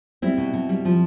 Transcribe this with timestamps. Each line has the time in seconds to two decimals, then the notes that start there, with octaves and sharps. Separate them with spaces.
0.22 G3 C4 E4
0.38 B2
0.54 B2
0.69 G3
0.85 F3